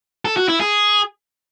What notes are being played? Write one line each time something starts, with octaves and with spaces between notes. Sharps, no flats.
A4
F#4
E4
G#4